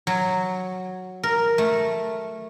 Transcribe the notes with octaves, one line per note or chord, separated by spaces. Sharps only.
F#3
A#4
A3